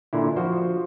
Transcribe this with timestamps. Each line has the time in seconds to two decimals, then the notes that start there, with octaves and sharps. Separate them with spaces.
0.13 A#2 D3 E4
0.36 F3 F#4 C5